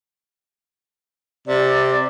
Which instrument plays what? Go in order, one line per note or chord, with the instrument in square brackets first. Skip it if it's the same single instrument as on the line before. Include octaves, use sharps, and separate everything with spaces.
[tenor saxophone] C3 [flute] D5